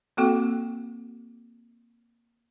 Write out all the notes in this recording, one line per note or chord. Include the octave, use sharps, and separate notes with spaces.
A#3 C4 F#4 A4 G5 D6